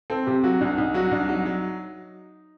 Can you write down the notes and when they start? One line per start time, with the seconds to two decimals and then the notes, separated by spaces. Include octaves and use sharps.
0.10 C4 A4
0.27 C3 G4
0.44 F#3 F#4
0.61 C2 D4
0.77 C2 D#4
0.94 F#3 F#4
1.11 C2 D4
1.29 F#3 D#4
1.45 F#3